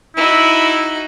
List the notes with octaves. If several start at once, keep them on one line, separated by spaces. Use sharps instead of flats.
D#4 E4 F#4